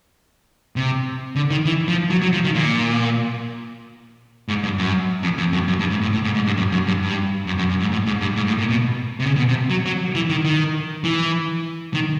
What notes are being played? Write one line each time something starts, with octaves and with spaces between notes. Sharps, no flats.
C3
D3
D#3
E3
F3
F#3
F#3
F3
D#3
A#2
G#2
G2
F#2
F2
F2
F#2
F#2
G2
G#2
A2
A2
G#2
G#2
G2
F#2
F#2
G2
G2
F#2
F#2
F#2
G#2
A2
G#2
G2
G#2
A2
A#2
B2
C3
C#3
B2
C3
F#3
F#3
E3
D#3
D#3
E3
D#3